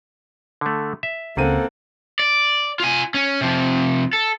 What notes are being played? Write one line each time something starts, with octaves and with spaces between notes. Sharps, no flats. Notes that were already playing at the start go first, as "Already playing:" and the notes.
D3 A3
E5
C#2 C#3 A#3 C4 A4 F#5 D#7
D5
F4 G#5
C#4
C3 F3
A4